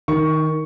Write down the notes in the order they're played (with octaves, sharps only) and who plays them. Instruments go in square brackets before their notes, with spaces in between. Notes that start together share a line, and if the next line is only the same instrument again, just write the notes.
[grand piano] D#3 C#6